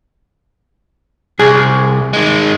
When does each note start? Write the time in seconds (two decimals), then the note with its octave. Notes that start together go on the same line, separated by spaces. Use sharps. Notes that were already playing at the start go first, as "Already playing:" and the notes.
1.39 C2 G#4
2.13 D#3 G#3